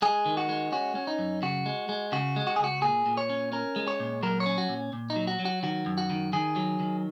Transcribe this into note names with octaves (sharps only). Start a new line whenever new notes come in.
G#3 G#4
D#3
F#4
G#3
C#4 F#4
C#4
D#4
F#2
C#3 F#4
G#3
G#3
C#3 F#4
G#3
F#4
G#4
C#2 F#4
A#2 G#4
A#2
C#5
C#4
C#4 A#4
G#3
C#5
A#2
F#3 A#4
C#5
C#4
F#4
A#2
A#2
D#4
F#3
F#4
F#3
F#4
D#3 F#4
F#2
F#4
D#3
D#3 G#4
F#3
D#3